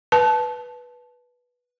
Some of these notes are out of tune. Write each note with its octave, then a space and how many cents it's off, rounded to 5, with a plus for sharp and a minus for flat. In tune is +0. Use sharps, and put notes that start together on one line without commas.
B4 -10 A5 -20